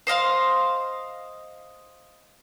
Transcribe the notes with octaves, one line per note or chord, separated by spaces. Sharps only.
C5 D#5 F5 C6